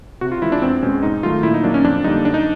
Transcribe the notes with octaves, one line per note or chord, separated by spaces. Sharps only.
C3 F#4
F4
E3 G#3 E4
D4
E2 C4
B2 G#3 C#4
G#2 D#4
D#3 F#3 A3 F4
A#2 E4
D#4
F#3 A#3 D4
C#4
F2 D4
D3 G3 A#3 D#4
F#2 D4
D#4